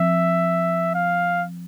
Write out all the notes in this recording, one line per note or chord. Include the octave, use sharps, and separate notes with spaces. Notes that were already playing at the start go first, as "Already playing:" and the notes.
Already playing: F3 C4 E5
F5